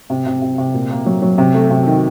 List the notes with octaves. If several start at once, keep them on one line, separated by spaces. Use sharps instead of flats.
C3
C3
C3
C3
A#2
A#3
F#3
F#3
C3
A3
C3
D#3